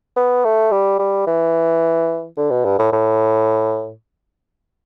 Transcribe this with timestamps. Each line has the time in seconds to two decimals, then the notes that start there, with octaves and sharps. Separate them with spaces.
0.17 B3
0.45 A3
0.72 G3
0.99 G3
1.27 E3
2.37 D3
2.51 B2
2.65 G2
2.79 A2
2.92 A2